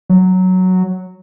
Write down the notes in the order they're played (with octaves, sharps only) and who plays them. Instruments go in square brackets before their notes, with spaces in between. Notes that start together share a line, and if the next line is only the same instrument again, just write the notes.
[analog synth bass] F#3